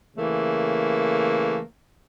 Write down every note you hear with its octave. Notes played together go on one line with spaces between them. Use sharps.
C#3 E3 A3 A#3